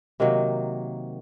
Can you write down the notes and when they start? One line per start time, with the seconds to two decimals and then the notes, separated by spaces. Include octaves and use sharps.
0.20 C3 D#3 F#3 A#3